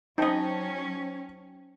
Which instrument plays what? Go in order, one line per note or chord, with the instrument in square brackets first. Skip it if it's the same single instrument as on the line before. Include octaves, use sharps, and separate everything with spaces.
[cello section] F#3 C#4 [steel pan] D#4 D#5 [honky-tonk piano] C5 G5 A5